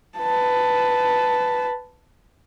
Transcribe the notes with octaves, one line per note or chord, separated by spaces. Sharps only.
B4 A5